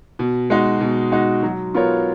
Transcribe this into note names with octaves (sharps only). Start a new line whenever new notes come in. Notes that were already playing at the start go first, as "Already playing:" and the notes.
B2
G#3 D#4 F#4
B2
G#3 D#4 F#4
F#3
B3 F4 A#4 C#5